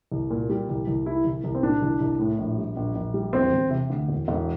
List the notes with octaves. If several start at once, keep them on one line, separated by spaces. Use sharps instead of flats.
C2
A#2
G3
C2
C2
G3 E4
C2
C2
C4
A#2 D4
C2
C2
A2
A#1
G3
A#1
A#1
G3
E1 C4
E1
C3
D2
E1
E1